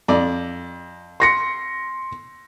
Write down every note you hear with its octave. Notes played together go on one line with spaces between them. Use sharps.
F2 D5
C6 A#6 C#7